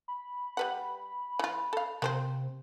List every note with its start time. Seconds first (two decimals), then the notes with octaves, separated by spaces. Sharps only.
0.08 B5
0.57 G3 B4 F#5
1.39 E3 F4
1.73 A4 F5
2.02 C3 A#3 C4 C5